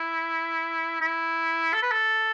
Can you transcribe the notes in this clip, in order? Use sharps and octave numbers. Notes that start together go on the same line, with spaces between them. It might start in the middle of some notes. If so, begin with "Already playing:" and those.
Already playing: E4
E4
A4
B4
A4